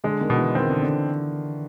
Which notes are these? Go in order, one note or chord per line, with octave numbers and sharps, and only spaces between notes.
D3 G#3
D#3
B2
E3
D#3 C4
D3
D3